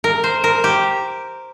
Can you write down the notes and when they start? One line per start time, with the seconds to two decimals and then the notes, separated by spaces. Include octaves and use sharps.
0.04 A#4
0.24 C5
0.44 A#4
0.64 G4